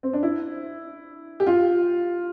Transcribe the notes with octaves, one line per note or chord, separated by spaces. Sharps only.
C4
D4
E4
G4
F4